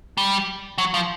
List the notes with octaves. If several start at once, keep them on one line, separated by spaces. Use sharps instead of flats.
G3
F#3
F3